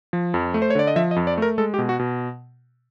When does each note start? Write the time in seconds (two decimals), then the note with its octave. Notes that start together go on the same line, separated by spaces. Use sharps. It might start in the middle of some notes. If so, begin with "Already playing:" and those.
0.13 F3
0.34 F2
0.54 A3
0.62 C5
0.70 C#5
0.75 D3 D5
0.87 D#5
0.96 F3 E5
1.11 D#5
1.16 F2
1.27 D5
1.38 A3 A#4
1.58 G#3 A4
1.74 G4
1.79 B2
1.89 F#4
1.99 B2